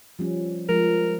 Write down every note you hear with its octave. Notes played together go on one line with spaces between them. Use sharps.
F3 G3 C#4
F3 G#3 A#4